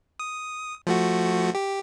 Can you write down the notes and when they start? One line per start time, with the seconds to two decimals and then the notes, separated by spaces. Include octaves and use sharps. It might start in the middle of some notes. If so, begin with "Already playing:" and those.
0.20 D#6
0.87 F3 A3 F#4
1.55 G4